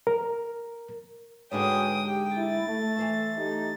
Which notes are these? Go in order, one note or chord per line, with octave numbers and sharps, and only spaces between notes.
A#4
G#2 D3 G#3 F#4 B4 C#5 G5 D#6
G4 G5
E4 A6
A3
E3 C5 E5
A3 D#4 G4